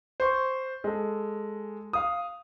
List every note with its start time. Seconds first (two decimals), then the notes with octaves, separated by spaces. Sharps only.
0.20 C5 C#6
0.84 G#3 A4
1.93 F5 D#6